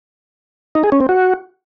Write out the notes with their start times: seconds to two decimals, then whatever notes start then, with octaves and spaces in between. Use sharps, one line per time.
0.75 D#4
0.84 G#4
0.92 C#4
1.00 C4
1.09 F#4